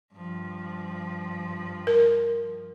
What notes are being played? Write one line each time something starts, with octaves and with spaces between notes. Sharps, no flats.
G2 F3
A#4